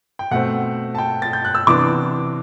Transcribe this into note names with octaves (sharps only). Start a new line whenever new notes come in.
G5
B2 A3 C4 F#5
A5
G5
A6
G6
F#6
E6
C3 E3 B3 D4 D6